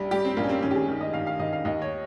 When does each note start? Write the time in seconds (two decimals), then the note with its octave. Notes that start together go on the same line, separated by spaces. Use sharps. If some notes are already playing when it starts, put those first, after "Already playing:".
Already playing: A#1 G3
0.11 G3 G4
0.25 C4
0.37 A#1 A#3
0.44 C#4
0.49 C4
0.62 D#3 C#4
0.71 G4
0.75 G#4
0.88 D#3
1.01 D#5
1.13 D#3 F5
1.27 F5
1.39 D#3 D#5
1.53 F5
1.65 D#2 D#5
1.82 C#5